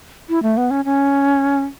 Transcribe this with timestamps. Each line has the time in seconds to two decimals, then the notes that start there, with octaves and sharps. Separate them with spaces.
0.29 E4
0.43 A3
0.57 B3
0.71 C#4
0.85 C#4